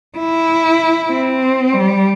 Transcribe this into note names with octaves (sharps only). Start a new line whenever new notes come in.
E4
C4
G3